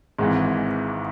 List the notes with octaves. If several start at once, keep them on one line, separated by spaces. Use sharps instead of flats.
G#1 G#2 E3 G#3